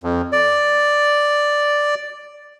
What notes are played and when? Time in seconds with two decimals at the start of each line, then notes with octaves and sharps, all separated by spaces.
0.03 F2
0.32 D5